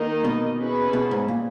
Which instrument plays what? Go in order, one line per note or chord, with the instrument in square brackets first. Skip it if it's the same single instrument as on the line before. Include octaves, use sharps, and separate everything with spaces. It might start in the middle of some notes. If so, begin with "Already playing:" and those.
Already playing: [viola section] D#3 A#3 D#4 A#4 D#5
[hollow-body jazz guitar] B2
[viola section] C#4 E4 G#4 B4
[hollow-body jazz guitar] B2
G#2
A#2